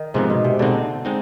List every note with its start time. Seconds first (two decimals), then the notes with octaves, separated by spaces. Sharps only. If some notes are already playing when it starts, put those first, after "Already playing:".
Already playing: D#3
0.14 G#2 C3 F3 B3 D#4
0.30 B2
0.44 C3
0.59 B2 D3 G#3 C4 D#4
1.05 G#3 C4 D#4